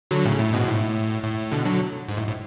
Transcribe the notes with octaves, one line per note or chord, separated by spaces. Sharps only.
D3 F#3
A2 C#3
A2
G#2 B2
A2
A2
B2 D3
D3 F#3
G#2
A2
A2